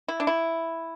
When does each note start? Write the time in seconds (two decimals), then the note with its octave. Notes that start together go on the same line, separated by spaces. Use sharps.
0.08 E4
0.20 D4
0.27 E4